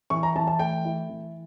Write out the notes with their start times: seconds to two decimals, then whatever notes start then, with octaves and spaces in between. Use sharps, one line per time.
0.10 E3 C#6
0.23 A#5
0.36 E3 A5
0.47 A5
0.59 A3 G5
0.85 E4
1.09 E3